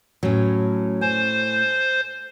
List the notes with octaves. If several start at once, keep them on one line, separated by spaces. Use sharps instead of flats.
A2 F#3 C#4
C5 G#5